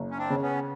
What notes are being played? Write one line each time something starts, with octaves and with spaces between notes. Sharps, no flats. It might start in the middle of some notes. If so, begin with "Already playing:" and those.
Already playing: F#1
C#4
C4 D4
C#3
B3 C#4